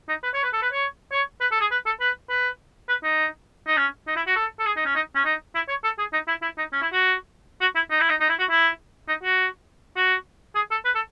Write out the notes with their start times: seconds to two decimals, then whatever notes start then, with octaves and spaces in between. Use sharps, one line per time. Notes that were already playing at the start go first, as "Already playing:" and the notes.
0.09 D#4
0.23 B4
0.34 C#5
0.43 B4
0.53 A4
0.62 B4
0.73 C#5
1.12 C#5
1.41 B4
1.52 A4
1.61 G#4
1.71 B4
1.86 A4
2.01 B4
2.30 B4
2.89 B4
3.03 D#4
3.68 D#4
3.77 C#4
4.07 D#4
4.16 E4
4.27 F#4
4.36 A4
4.60 A4
4.66 G#4
4.76 D#4
4.85 C#4
4.95 D#4
5.15 C#4
5.25 D#4
5.55 E4
5.69 C#5
5.84 A4
5.99 G#4
6.13 D#4
6.28 E4
6.42 E4
6.58 D#4
6.73 C#4
6.82 E4
6.93 F#4
7.61 F#4
7.76 E4
7.91 D#4
8.01 E4
8.10 D#4
8.20 D#4
8.29 E4
8.39 F#4
8.50 E4
9.08 D#4
9.23 F#4
9.96 F#4
10.55 G#4
10.71 A4
10.85 B4
10.95 A4